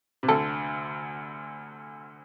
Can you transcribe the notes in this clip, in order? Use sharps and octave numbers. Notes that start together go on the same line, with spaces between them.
C3
D2 D3 A4